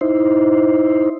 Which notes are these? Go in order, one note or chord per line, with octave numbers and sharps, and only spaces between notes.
D#4 E4 C5